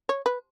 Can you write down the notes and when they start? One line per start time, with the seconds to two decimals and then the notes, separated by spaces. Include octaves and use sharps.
0.09 C#5
0.26 B4